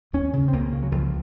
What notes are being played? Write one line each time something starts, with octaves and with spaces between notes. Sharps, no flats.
D#2 C#4
C#3
C4
C#2 A#3
C#3
F#3
C#2 F3